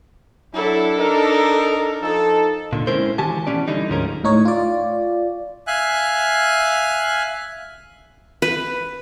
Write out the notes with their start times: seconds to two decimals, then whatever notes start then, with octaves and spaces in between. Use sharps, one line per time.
0.54 F#3 D4 E4 A4
0.97 D#4 A#4
2.02 F3 D#4 A4
2.73 A#2 D3
2.87 G#3 C4 C#4 E4 A#4 C5
3.18 D#3 E3 F#4 G4 G#5 A5
3.47 B2 E3 F3 C4 C#4 D5
3.68 D3 E3 G3 D#4
3.90 D2 G#2 F3 C#4 G#4 A#4
4.24 A2 D#4 C#5
4.45 F4 D5
5.67 E5 F5 G#5 F#6
8.42 B4